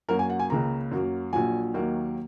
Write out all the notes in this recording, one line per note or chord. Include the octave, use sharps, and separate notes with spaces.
F#2 F#3 A#3 A#4
G#5
F#5
G#5
C#2 C#3 A#3 A#5
F#2 F#3 A#3
A#1 A#2 F#3 G#5
D#2 D#3 F#3 A#3